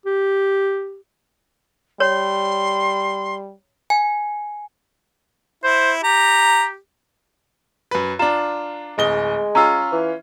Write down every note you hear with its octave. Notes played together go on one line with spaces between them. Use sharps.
G4
G3 C#5 C6
G#5
E4 C5
G4 A#5
F#2 B4
D4 F4 A#5 E7
D1 G#3 D#5 G7
C#4 F4 A#5 E6
E3